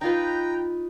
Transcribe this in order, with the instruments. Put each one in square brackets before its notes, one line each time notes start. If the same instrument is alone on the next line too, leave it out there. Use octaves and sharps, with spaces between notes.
[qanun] D#4 F4 B4 [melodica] G5 A#5